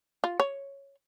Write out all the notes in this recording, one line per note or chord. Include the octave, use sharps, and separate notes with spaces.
F4
C#5